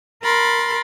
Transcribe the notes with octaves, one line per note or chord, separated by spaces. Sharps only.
A#4 B5 C6 A6